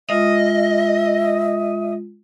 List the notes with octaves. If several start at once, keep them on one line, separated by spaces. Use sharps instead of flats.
G#3 F4 D#5 E5